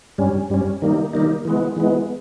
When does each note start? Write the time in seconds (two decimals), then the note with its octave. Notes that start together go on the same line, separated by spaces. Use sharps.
0.18 G2 G3 C#4
0.50 G2 G3 C#4
0.82 D#3 G3 A#3 D#4
1.13 D#3 G3 A#3 D#4
1.45 E3 G#3 B3
1.76 E3 G#3 B3